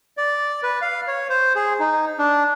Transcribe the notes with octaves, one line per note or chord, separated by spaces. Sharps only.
D5
B4
F5
C#5
C5
G#4
D#4
D4